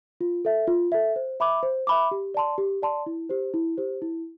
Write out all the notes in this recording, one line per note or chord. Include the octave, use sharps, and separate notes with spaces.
F4
A4 E5
F4
A4 E5
C5
E5 B5 D6
C5
E5 B5 D6
G4
D5 A5 C6
G4
D5 A5 C6
E4
G4 C5
E4
G4 C5
E4